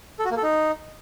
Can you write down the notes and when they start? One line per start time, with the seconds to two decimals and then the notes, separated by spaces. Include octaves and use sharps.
0.19 A4
0.25 F#4
0.31 A#3
0.37 A4
0.43 D#4